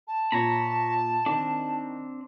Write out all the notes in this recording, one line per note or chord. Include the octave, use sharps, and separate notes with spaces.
A5
A#2 C#5 A#5 B5
D#3 C4 D4